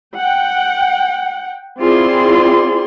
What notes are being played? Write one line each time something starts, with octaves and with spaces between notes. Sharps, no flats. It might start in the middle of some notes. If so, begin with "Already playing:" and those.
F#5 G5
C4 E4 F4 G#4 D5 C6